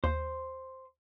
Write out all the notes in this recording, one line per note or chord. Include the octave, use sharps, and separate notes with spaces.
D#2 C5